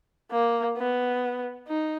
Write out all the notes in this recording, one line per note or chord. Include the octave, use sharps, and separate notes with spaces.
A#3
B3
D#4